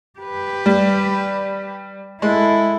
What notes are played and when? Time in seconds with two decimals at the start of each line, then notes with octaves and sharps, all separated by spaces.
0.19 G4 B4
0.66 G3
2.22 G#3 E4 A4